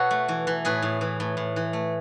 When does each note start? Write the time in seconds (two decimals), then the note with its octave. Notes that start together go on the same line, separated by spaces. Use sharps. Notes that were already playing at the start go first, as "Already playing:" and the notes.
Already playing: B2 F#4 A4 B4 C#5
0.11 A3
0.28 E3
0.47 E3
0.65 A2 G#4 B4
0.82 A2
1.01 E3
1.20 A2
1.37 A2
1.56 E3
1.73 A3